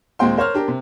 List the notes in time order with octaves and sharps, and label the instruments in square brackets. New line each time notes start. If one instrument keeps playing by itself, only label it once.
[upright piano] D#2 A#2 G#3 C4 G5 C6
A#4 C5 C#5 F6
D4 G4 A#4
C3